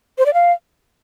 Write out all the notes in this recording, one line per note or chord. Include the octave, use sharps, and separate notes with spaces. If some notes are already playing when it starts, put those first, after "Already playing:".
C5
D5
F5